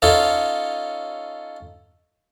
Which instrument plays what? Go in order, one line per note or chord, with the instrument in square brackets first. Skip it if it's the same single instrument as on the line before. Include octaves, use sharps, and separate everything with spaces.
[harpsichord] C#4 D#4 F4 A4 C#5